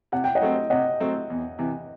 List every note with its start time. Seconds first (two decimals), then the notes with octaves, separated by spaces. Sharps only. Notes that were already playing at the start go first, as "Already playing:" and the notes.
0.12 C3 F#5
0.24 G5
0.35 D#5 F#5
0.41 F#3 A3 C4
0.70 C3 D#5 F#5
1.00 F#3 A3 C4
1.30 E2
1.59 C3 E3